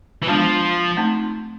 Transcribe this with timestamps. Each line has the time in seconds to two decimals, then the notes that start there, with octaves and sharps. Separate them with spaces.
0.23 E3
0.27 F3 G#3 B3 D4 F4
0.97 A3 C4 D#4